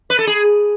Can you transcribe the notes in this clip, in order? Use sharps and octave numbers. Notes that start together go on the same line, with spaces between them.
B4
A4
G#4